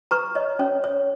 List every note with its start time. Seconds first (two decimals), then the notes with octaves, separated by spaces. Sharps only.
0.11 B4 A#5 C#6
0.35 C#5 D#5
0.59 C#4 C#5
0.84 C#5